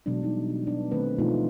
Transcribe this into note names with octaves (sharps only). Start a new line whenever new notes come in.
B2 E3 F#3 G#3 D4
F#3 G3 D#4
B3 D4
D#3 A3 C4 B4
B2 E3 F3 A3 D#4 F4